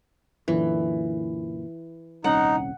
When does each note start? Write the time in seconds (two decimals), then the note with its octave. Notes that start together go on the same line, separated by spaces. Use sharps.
0.48 F#2 A#2 D3 E3
2.24 D#1 C2 C#4 D#4 F#5